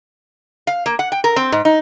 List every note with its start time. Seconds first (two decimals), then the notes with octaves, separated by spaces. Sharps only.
0.67 F5
0.86 A#3
0.99 F#5
1.12 G5
1.24 A#4
1.36 C4
1.52 G#2
1.65 D#4